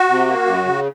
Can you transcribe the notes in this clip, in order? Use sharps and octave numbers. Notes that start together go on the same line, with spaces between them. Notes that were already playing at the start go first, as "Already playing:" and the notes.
Already playing: F#4
C3
A#3
F#2
C#3